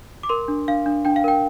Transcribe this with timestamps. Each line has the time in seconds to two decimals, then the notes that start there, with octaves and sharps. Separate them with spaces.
0.23 D6
0.29 A#4 C6
0.48 D4
0.68 D4 F5
0.86 D4
1.05 D4 G5
1.16 F5
1.24 A#4 G5